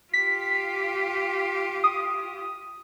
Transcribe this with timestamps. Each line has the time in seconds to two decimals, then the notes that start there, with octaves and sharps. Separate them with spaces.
0.13 F4 G4 B6
1.84 D#6